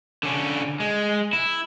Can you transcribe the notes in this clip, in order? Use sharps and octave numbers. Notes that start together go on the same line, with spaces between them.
D3 C#4
G#3
E4